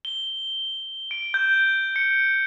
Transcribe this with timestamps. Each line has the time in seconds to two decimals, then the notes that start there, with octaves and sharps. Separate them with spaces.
0.05 G7
1.11 D7
1.34 G6
1.96 C#7